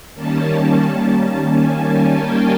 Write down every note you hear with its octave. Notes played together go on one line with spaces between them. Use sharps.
D#3 G3 A#3 C#4 A5
G#5
G5